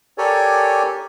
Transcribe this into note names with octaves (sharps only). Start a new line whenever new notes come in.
G4 A4 A#4 C#5 D5 G#5